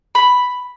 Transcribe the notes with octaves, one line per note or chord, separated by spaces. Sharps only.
B5